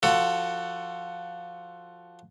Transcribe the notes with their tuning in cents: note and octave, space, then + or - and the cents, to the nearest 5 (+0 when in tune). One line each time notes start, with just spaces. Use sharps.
F3 +0 F#4 +10 A4 +20